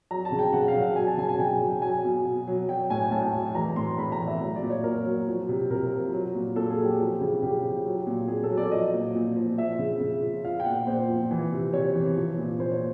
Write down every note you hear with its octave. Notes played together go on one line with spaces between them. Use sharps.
F#3 A#5
A5
C#3
G5
C#3 F#5
F5
F#3
F#5
F#3 G#5
A5
C#3 G#5
G#5
C#3 G5
F#3
F#3 G#5
B2
B2
F#3
F#3 G5
A2 G#5
A2 A5
F#3
E3 A#5
A2 C6
A2 B5
A#5
E3
E5
F#3
D5
A#2
C#5
A#2 A#4
F#3
F3
C3
C3 A#4
F3
F#3
A#2
A#2 A4
G#4
F#3
G4
F3
C#3
C#3 G4
F3
F#3
A#2
A#2 G#4
A4
F#3
D5
F3 D#5
A#2
A#2
F3
F3 E5
C#3
C#3
F3
F3 F5
G5
A#2 F#5
A#2 C5
F3
E3
C3
C3 C#5
E3
F3
A#2
A#2 C5
C#5